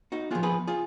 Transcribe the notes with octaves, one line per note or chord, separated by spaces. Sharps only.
D#4 F#4
F3 B3 F4 G#4
G#4 B4
F4 G#4